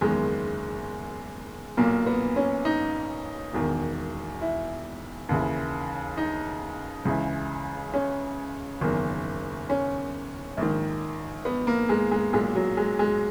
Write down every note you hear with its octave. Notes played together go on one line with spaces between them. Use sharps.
F#1 E2 D#3 G#3
B1 A#2 A#3
B3
C#4
D#4
E1 E2 D#3
E4
D#2 C#3 E3
D#4
C#2 C#3 E3
C#4
F#1 E2 D#3
C#4
A#1 G#2 D#3
B3
A#3
G#3
G#3
B1 A#2 G#3
F#3
G#3
G#3